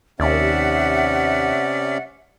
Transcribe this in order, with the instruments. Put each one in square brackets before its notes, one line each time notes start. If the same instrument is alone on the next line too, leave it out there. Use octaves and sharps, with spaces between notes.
[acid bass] D#2 [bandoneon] C3 C#4 D5 [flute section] E5 F#5